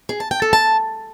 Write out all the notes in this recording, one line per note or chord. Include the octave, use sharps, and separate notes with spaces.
G#4
A5
G5
A4
A5